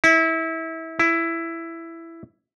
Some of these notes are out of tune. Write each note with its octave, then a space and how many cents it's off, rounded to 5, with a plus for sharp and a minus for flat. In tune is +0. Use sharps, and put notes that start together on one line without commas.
E4 -25
E4 +10